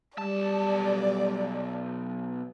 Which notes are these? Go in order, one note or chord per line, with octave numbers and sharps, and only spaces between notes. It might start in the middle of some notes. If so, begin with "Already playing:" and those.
B1 G3 D5 A5